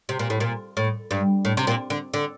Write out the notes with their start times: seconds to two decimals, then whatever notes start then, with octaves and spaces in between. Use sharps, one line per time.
0.09 C3
0.19 A#2
0.30 A2
0.40 A#2
0.77 A2
1.11 G2
1.45 A2
1.57 C3
1.67 A#2
1.90 D3
2.14 D3